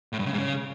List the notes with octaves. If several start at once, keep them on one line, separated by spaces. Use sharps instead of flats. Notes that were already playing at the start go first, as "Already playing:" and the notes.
A2
G2
C#3
G#2
C#3